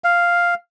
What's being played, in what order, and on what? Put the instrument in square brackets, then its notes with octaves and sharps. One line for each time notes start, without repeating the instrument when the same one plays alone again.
[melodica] F5